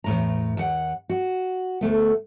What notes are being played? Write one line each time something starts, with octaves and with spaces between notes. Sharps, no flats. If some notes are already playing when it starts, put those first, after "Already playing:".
E2 A2 A#5
D#2 F#5
F#4
D2 A3 B3